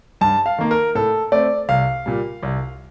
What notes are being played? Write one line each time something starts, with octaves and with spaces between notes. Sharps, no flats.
G2 A5
F5
D#3 A#3
A#4
A2 A4
A3 C4 D5
C2 F5
A#2 G3
C2